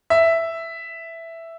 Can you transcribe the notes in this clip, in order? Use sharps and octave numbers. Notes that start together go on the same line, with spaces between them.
E5